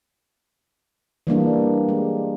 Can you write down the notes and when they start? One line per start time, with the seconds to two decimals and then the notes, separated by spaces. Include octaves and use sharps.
1.27 E3 G3 A#3 D4
1.89 G#3